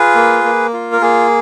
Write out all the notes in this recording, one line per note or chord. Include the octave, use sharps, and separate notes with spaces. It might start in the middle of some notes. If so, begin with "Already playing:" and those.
Already playing: F4 G#4 B4
A#3
A#3
F4
A#4
A#3 G#4